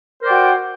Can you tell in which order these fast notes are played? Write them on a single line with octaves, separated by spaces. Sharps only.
A#4 C5 D5 G5 F#4